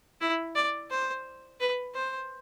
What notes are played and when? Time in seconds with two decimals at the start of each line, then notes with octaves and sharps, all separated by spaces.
0.21 E4
0.55 D5
0.91 C5
1.60 B4
1.95 C5